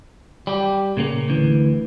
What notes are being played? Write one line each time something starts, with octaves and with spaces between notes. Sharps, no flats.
G3 G4
A#2 C#3 A#3
D2 E3